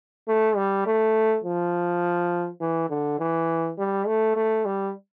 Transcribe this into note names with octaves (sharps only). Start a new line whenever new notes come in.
A3
G3
A3
F3
E3
D3
E3
G3
A3
A3
G3